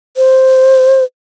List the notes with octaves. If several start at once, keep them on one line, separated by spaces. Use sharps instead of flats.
C5